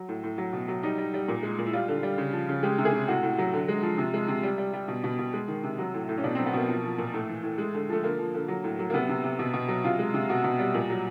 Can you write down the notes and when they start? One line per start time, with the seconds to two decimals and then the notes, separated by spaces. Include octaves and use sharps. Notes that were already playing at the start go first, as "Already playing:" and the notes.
Already playing: F#3
0.09 A2
0.23 A2
0.38 F#3
0.53 B2
0.68 F#3
0.83 G3 D#4
0.98 G3
1.14 G3
1.28 A#2
1.43 G#3
1.59 A#2
1.66 E4
1.73 G3 F4
1.88 D3
2.03 G3
2.18 C#3
2.33 F3
2.49 C#3
2.63 G#3 G4
2.78 C3
2.85 G#4
2.93 C3
3.08 A2 F#4
3.23 A2
3.38 F#3
3.53 D3
3.68 G#3
3.83 F3
3.98 C3
4.14 G#3
4.28 C3
4.43 G3
4.58 G3
4.73 G3
4.88 B2
5.04 B2
5.19 B2
5.33 G#3
5.48 D#3
5.64 C3
5.78 F#3
5.94 A2
6.09 A2
6.18 C#4
6.24 B2 D4
6.35 C4
6.39 F#3
6.46 B3
6.54 B2 A#3
6.68 F3
6.84 F3
6.98 A#2
7.13 A2 A3
7.29 E3
7.43 A2
7.58 G#3
7.74 D3
7.89 F3 A3
8.03 D3 A#3
8.19 F3
8.34 D3
8.48 F#3
8.64 A2
8.79 F#3
8.90 A#3
8.94 C3 B3
9.09 C3
9.24 C3
9.39 B2
9.53 B2
9.68 F#3
9.84 C3 F4
9.99 G#3
10.14 C3
10.29 B2 F#4
10.44 B2
10.59 G3
10.74 A#2
10.90 F#3